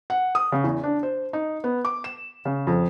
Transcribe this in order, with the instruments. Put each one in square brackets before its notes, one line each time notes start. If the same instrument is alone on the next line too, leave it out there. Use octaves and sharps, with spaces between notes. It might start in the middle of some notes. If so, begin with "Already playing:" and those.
[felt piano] F#5
D#6
C#3
E2
D4
C5
D#4
B3
D6
E7
C#3
F2